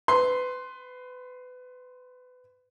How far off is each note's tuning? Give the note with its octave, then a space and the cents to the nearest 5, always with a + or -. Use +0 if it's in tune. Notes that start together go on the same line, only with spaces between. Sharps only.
B4 +25 C6 +0